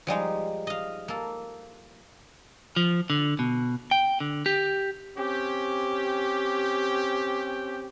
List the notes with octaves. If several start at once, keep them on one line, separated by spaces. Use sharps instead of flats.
F3 G3 G#3 D#4
D#5 F5
A#3 A4
F3
D3
B2
G5
D3
G4
C4 C#4 G4